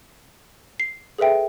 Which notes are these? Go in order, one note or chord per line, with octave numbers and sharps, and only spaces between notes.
C7
G#4 A4 B4 E5 G5